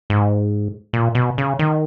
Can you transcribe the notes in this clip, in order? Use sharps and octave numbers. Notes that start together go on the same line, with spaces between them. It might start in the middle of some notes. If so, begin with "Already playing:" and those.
G#2
A#2
B2
C#3
D#3